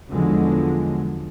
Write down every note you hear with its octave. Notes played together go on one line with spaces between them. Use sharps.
E2 D3 F3 F#3 G#3